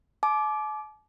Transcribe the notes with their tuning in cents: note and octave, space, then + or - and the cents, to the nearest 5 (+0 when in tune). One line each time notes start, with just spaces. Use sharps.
A5 -45 D6 +0